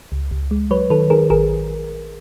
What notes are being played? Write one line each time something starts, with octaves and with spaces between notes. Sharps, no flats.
C#2
C#2
G#3
F#3 B4 C#5
D#3 A4 B4
D#3 G#4 A#4
A1 G#4 A#4